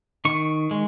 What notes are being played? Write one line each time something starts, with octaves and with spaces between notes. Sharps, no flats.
D#3 C#6
G#3